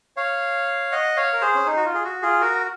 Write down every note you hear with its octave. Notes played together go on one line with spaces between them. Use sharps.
C#5 F5
D#5 F#5
C#5 F5
A#4
G#4 C5
C#4
D#4
F#4
F4
G#4
F#4
F4 G#4
F#4 A#4